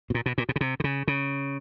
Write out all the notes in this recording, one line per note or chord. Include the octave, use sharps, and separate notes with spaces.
B2
A#2
B2
A#2
B2
C#3
C3
D3
C#3
C#3